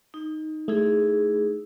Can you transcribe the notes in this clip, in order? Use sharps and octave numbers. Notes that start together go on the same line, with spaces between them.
D#4
A3 D#4 E4 G#4